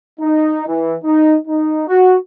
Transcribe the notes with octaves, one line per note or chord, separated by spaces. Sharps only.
D#4
E3
D#4
D#4
F#4